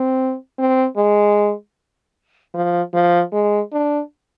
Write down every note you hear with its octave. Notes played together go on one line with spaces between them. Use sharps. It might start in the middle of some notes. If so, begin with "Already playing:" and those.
Already playing: C4
C4
G#3
F3
F3
G#3
D4